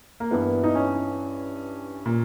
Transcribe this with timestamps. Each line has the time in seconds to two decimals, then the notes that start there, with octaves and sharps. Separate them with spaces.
0.20 A#3
0.31 G2 E3 B3
0.64 D#4
0.75 C#4
2.06 A#2